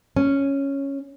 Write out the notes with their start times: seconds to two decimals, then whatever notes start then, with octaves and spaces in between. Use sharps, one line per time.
0.16 C#4